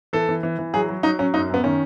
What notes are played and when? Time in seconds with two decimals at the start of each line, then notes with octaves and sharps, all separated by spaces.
0.13 E3 A4
0.29 E3
0.43 E3
0.59 E3
0.74 F#3 G#4
0.88 F#3
1.03 F#3 D#4
1.19 F#3 C#4
1.34 F#2 D#4
1.49 F#2 B3
1.64 D#3 C#4